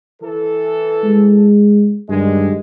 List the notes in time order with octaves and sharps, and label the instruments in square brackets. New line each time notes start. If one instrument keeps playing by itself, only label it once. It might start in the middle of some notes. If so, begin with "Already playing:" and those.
[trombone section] E3 A4
[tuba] G#3
[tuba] G2 [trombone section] D3 D#3 G#3